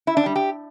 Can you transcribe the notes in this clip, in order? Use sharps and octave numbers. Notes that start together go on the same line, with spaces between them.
E4
D4
G3
G4